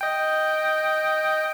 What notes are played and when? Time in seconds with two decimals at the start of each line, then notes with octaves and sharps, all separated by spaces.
0.01 D#5 G5